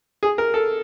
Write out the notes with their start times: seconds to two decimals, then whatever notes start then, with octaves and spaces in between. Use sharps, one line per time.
0.23 G#4
0.38 A#4
0.54 A4